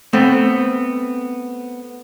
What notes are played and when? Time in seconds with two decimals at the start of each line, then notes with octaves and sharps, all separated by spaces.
0.13 A3 B3 C4